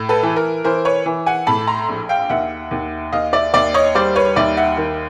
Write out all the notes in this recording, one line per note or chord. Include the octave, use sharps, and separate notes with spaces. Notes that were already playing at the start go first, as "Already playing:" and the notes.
Already playing: A2
A4 B4
E3
A#4
E3 A#4 C5
B4 C#5
E3
F#5 G#5
A2 A5 B5
A#5 C6
A#1
F5 G5
D#2 E5 F#5
D#2
D#2 D#5 F5
D5 E5
D#2 D5 E5
C#5 D#5
G3 C5 D5
B4 C#5
D#2 D5 E5
E5 F#5
D#3